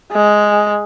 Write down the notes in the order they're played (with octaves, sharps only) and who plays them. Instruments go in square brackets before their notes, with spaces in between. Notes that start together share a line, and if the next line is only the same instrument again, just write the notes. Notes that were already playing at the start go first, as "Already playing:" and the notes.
[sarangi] G#3